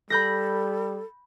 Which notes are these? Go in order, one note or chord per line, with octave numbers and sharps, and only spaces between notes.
G3 A4 B5 G6 A#6